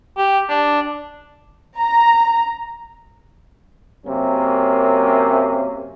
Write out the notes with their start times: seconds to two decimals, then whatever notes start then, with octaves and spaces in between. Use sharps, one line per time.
0.17 G4
0.49 D4
1.78 A#5
4.06 F#2 C3 A#3 C#4